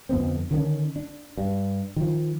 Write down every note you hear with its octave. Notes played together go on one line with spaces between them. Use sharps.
F2 D3 B3 C4
D3 D#3 A#3 C#4
D4
G2
D#3 F3